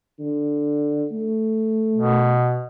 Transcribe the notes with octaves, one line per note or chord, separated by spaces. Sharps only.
D3
A3
B2